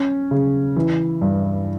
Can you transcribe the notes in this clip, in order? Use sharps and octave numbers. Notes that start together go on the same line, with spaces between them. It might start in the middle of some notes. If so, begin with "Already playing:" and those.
Already playing: C#4
C#3
E3
G2